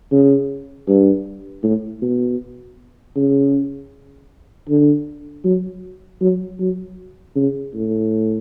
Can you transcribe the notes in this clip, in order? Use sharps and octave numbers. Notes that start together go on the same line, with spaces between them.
C#3
G2
A2
B2
C#3
D3
F#3
F#3
F#3
C#3
A2